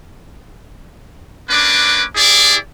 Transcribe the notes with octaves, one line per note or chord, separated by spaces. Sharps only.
A#3 C#4 D4 B4 D6
E4 G4 G#4 D5